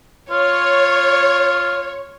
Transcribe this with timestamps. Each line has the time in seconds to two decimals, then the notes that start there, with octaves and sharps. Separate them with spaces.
0.31 F4 C#5